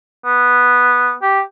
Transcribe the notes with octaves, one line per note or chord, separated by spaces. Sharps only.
B3
G4